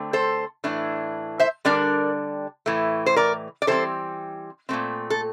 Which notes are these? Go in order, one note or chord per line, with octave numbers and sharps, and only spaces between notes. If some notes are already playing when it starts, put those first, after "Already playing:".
Already playing: D3 A3 C4
A4 C5
A2 E3 A3 D4
C5 E5
D3 G3 D4 A#4 D5
A2 E3 A3
C5
A#4 D5
D5
E3 G3 C4 A4 C5
A#2 A3 C4
A4